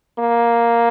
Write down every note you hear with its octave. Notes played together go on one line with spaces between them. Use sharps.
A#3